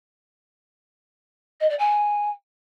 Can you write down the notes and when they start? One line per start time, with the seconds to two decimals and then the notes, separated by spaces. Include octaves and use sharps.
1.60 D#5
1.69 D5
1.79 G#5